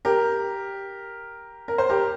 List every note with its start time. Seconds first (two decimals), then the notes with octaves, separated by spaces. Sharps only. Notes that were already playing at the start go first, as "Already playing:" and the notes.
0.05 G4 A#4
1.68 A#4
1.78 C5
1.90 G4 A#4